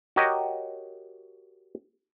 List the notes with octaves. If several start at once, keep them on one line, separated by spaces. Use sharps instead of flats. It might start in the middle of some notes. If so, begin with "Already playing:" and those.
F#4 G4 A#4 C#5 D#5